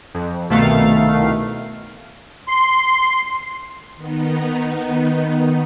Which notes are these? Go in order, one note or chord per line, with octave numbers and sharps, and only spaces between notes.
F2
C2 B2 D#3 A3 F5
C6
D#3 B3 D#4